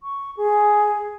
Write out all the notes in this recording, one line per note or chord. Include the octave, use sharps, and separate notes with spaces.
C#6
G#4